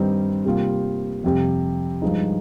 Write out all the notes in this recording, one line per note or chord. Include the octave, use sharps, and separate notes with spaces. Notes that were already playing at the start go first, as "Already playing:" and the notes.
Already playing: G2 D#3 G3 C4 D#4
C3 G3 A#3 F4
F2 C3 G3
G2 F3 G#3 D#4